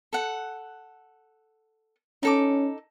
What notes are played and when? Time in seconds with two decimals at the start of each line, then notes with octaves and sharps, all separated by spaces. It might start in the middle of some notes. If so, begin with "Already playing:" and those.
0.13 A4 F#5
2.23 C#4 D#4 A4 D6